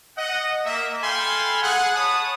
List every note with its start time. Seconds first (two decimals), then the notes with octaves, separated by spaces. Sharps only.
0.17 D#5 F#5
0.65 A#3 E5
1.03 A4 F5 G5 G#5 B5 C6
1.63 G#4 F#5
1.96 C#5 A5 B5 D#6